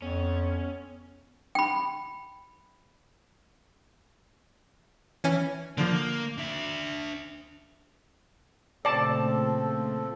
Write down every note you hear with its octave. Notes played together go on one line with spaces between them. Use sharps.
F2 B3 C#4
G5 B5
E3 C#4 G#5
D3 F3 A#3
D4 E5
A#2 C#3 F3 A3 C4 A4 D5 A5